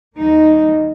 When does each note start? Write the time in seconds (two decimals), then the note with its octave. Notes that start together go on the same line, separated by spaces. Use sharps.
0.16 D#2 D#3 G3 A#3 D#4